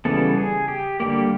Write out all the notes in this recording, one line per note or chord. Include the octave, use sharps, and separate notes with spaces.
C#3 E3 G3 B3 A4
G#4
G4
D3 G3 A#3 G4